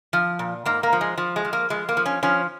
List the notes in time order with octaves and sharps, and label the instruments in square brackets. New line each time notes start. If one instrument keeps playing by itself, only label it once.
[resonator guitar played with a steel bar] F3
A#2
G#2 A#3
A#3
F3
G#3
F3
G#3
F3
A#3
F3 G#3
A#3
F3
C#4
F3 C#4